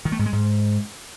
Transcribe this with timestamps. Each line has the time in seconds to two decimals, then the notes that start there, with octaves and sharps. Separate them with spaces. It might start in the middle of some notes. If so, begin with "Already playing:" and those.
0.05 D#3
0.12 A3
0.19 G#2
0.26 G#3
0.33 G#2